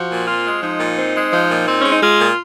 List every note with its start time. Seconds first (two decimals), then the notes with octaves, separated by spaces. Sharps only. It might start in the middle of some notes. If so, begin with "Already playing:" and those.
Already playing: F3 F#4
0.10 A#2
0.27 C4 F4
0.45 G#3
0.62 F3 D#4
0.80 A#2
0.97 C4
1.15 G#3
1.32 F3
1.50 A#2
1.68 C4
1.80 G#3 C#4
1.91 D#4
2.02 G#3 F4
2.20 A#2